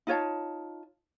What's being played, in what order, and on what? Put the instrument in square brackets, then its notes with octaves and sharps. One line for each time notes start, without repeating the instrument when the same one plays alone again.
[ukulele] D#4 F4 C#5 A5